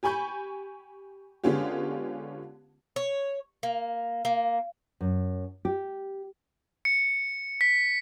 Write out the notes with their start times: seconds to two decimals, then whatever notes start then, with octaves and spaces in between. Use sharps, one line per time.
0.03 G4 G#5 B5 C#6 G6
1.44 D3 G#3 B3 C#4 F4 G4
2.96 C#5
3.63 A#3
4.25 A#3
5.01 F#2
5.65 G4
6.85 C#7
7.61 B6